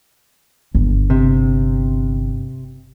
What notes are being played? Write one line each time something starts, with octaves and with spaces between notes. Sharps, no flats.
G1
C3